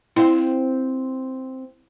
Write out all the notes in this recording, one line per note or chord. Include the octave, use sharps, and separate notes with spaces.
C4 E4 F5